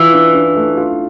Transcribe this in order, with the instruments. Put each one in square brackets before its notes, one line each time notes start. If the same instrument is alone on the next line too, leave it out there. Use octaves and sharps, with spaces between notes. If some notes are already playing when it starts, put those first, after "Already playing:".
Already playing: [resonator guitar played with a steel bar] E3 [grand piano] F4
[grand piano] D4
D4
A3
F4